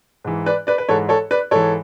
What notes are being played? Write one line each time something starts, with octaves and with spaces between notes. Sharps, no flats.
G#2 E3
B4 D5
B4 D5
B4
G#2 E3 A4 C#5
A4 C#5
B4 D5
G#2 E3 A4 C#5